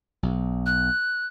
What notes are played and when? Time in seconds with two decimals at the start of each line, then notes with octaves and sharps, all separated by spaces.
0.23 B1
0.66 F#6